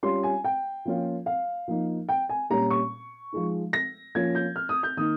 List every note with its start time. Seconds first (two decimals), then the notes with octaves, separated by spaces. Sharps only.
0.03 G3 C#4 F4 C6
0.23 G#5
0.44 G5
0.85 F3 A#3 C#4 F4
1.26 F5
1.68 F3 A#3 D#4
2.09 G5
2.29 G#5
2.50 A#2 G3 C#4 A#5
2.70 C#6
3.32 F3 G#3 D#4
3.73 A#6
4.15 F3 A#3 C#4 F4 G#6
4.35 G6
4.56 F6
4.69 D#6
4.83 G6
4.97 D#3 A#3 D#4 D#6